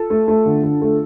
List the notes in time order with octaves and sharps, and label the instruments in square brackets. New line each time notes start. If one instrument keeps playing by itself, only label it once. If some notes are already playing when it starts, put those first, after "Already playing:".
Already playing: [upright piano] F4 A4
A3
A3
D3
D3
A3